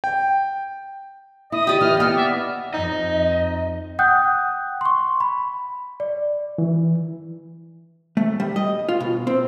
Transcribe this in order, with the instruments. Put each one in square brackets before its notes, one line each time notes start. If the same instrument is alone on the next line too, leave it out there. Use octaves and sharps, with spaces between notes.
[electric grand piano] G5
[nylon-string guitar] E4 [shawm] D#5 [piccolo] D#6
[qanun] G4 D5
[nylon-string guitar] E3 E4 [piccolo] F6
[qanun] B3 [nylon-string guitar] C4 G5 [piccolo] F6
[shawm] D5 [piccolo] E5
[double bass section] F2 [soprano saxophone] D#4 [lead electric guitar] D#5
[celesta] F#5 G5 D#6 F#6 G6
C6 C#6
B5
D5
[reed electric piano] E3
[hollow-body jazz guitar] A3
G3
D#5
F4
B2
C4